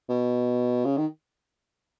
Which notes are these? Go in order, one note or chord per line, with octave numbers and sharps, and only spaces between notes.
B2
C#3
D#3